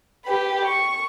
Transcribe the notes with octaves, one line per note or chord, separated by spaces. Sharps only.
G4 B4
C#6